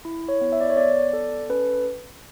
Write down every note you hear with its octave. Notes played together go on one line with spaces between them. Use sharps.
E4
C#5
B3
E5
D5
C#5
B3 D5
A4
C#4 B4